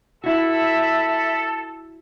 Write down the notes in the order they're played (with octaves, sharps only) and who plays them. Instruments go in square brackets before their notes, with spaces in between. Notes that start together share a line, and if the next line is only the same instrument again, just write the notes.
[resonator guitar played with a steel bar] E4 F#4 [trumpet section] A4 [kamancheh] E5 B5